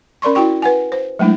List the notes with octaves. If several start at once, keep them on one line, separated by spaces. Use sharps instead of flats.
C#4 A#4 D5 C6 C#6
E4 F#4 G5 C#6
B4 F#5 G#5
C5
F#3 G#3 A3 D4 E4